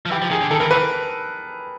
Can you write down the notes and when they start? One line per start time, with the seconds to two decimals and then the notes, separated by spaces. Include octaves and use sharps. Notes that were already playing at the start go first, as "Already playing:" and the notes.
0.06 F3
0.11 E3 G4
0.22 F3
0.30 D#3 G#4
0.41 D3
0.51 D#3 A4
0.60 E3 A#4
0.71 E3 B4